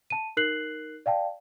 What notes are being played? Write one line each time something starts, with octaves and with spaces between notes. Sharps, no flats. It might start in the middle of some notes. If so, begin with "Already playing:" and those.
A5 D#7
D#4 A#4 F#6 C7 F#7
D5 F5 G5 A5